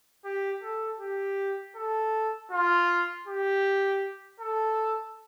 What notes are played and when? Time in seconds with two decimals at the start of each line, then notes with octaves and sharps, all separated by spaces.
0.25 G4
0.63 A4
1.00 G4
1.76 A4
2.51 F4
3.27 G4
4.40 A4